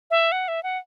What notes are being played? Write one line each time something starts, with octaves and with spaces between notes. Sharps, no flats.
E5
F#5
E5
F#5